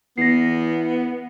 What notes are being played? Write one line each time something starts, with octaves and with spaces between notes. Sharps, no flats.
E2 B3 A#6 C7